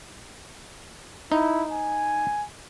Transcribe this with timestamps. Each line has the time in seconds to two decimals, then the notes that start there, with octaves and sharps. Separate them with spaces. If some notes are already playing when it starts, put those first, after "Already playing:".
1.32 D#4 E4
1.72 G#5